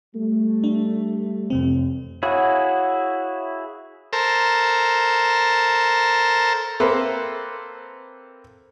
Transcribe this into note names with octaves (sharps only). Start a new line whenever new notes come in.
G3 A3
D4
A1 F2 C3 C4
E4 F#4 G#4 C#5 F5 F#5
A4 A#4 C5
A#3 C4 A4 B4 C5 E5